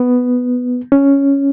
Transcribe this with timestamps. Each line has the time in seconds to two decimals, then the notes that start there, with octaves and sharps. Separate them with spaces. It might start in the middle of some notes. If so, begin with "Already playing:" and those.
Already playing: B3
0.92 C#4